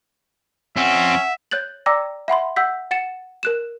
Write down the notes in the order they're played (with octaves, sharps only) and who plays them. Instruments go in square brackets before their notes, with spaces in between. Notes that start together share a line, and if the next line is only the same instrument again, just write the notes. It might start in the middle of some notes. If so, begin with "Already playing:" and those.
[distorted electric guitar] F2 C4 [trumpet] C#4 [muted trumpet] E5 [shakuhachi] F#5
[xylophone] C#5 F#6 G6 A6 F#7
D5 G5 A#5 D6 E6 A#6
E5 F#5 B5 C6
F#5 E6 G6 B6
F#5 A6 C#7 E7
A#4 F#6 E7